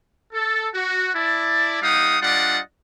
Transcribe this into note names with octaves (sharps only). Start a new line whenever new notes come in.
A4
F#4
E4 D5 A5
G3 D#4 F5 F#5 D#6
G3 D4 F4 D5 D#5 F#5